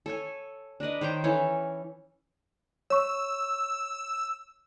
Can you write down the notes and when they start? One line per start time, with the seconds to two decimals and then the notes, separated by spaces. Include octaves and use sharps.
0.06 A4 C#5 G#5
0.80 D4 A#4 B4 D#5
1.01 D#3 C5 C#5 G5
1.24 E3 C#4 A4 C#5
2.90 C#5 C#6 E6